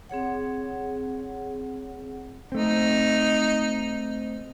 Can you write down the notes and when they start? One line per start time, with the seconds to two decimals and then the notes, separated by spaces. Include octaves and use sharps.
0.09 C4 G#4 C#5 F#5
2.52 A3 C4 D#4